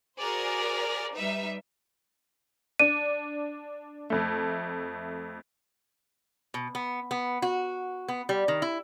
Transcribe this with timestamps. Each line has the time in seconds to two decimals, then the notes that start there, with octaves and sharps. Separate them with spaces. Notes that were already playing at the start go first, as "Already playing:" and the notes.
0.18 F#4 G#4 A#4 C5 D5
1.16 G3 D#4 B4 E5
2.79 D4 D#7
4.10 F2 A3
6.54 B2
6.75 B3
7.11 B3
7.42 F#4
8.08 B3
8.29 G3
8.48 D#3
8.62 E4